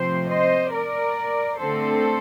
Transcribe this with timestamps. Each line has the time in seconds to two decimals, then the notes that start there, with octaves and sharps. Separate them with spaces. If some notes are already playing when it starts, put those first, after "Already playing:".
Already playing: C3 F3 A3 C4 C5
0.29 C5 D#5
0.72 A#4 D5
1.59 D3 A3 C4 A4 C5